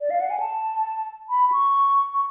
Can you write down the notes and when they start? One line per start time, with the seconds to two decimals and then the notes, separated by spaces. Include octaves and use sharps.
0.01 D5
0.10 F5
0.21 F#5
0.30 G#5
0.40 A5
1.29 B5
1.52 C#6
2.14 C#6